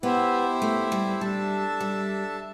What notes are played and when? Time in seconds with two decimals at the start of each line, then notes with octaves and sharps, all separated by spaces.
0.03 B3 E4 G4 C5 E5
0.62 A3
0.92 G3
1.20 G3 D4 A4 E5 A5
1.81 G3